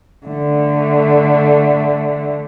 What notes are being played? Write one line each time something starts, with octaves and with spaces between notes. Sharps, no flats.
D3 A3